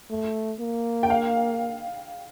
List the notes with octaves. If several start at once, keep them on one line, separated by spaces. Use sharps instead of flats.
A3
A#3
G5
F5